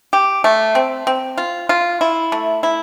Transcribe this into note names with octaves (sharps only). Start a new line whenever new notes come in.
G4
A3
C4
C4
F4
F4
E4
A3
E4